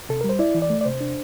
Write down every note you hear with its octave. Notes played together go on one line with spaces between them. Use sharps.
C3 A4
G3 A#4
C5
E4 D5
E3
D5
A3
D5
C3 C5
D4